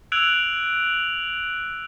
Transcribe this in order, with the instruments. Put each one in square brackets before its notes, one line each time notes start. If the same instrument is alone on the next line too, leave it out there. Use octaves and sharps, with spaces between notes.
[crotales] E6 F#6 G#6 D7 F7 F#7